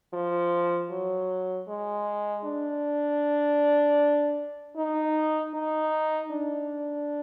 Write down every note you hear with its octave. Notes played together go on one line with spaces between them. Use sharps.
F3
F#3
G#3
D4
D#4
D#4
D4